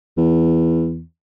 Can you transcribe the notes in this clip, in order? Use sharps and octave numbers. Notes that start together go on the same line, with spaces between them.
E2